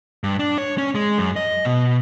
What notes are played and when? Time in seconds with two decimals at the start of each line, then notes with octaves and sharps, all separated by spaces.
0.24 G2
0.39 D4
0.58 C#5
0.78 C#4
0.95 G#3
1.18 F#2
1.36 D#5
1.65 B2